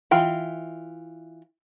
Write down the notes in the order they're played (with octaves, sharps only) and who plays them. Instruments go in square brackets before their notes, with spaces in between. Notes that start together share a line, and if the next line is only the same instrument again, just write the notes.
[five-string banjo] E3 F4 G5 B5